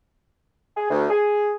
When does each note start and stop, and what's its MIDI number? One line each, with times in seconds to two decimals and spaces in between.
0.77 0.86 68
0.90 1.07 38
1.10 1.53 68